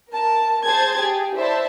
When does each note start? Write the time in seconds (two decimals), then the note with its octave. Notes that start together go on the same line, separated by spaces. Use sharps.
0.13 A#4 A5
0.64 G#4 C5 A5 G#6 A6
0.99 G4 G#4
1.35 E4 C5 D5 E5 A5